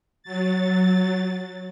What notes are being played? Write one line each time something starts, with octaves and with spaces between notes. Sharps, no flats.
F#3 A6